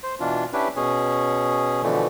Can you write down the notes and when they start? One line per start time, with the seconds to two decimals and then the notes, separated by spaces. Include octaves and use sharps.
0.03 C5
0.20 B2 E3 D4 F4
0.53 C#4 D4 E4 G4 B4
0.76 B2 C#4 G#4
1.83 B2 D3 E3 F3 A3